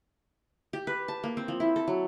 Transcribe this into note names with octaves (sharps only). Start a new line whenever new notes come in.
G4
B4
A5
A#3
C4
F3
E4
A4
F#3